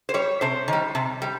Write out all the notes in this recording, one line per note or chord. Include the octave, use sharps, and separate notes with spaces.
C5
G3 C#5
C3 C5
D#3 G3
C3
G3